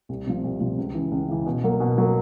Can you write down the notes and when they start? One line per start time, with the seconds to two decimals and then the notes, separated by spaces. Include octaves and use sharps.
0.09 C2
0.27 C3 F3
0.44 C2
0.61 C3 F3
0.78 C#2
0.94 C#3 E3
1.11 C#2
1.28 C#3 E3
1.46 B2
1.64 F#3 A#3
1.80 B2
1.98 F#3 A#3